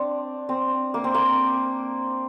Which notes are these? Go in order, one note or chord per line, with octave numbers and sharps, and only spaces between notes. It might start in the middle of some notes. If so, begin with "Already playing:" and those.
Already playing: C4 D4
C4
A#3
C4
A#3